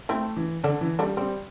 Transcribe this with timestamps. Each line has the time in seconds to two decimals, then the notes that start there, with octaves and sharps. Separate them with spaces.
0.09 A3 C4 E4
0.36 E3
0.63 D3 A3 D4
0.81 E3
0.99 G3 A3 D4
1.17 G3 C4